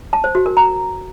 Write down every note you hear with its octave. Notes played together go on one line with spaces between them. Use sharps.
A5
C5
F#4
A#4
A#5